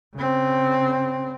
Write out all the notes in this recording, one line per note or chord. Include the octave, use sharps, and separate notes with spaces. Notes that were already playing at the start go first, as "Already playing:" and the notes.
C#3 C4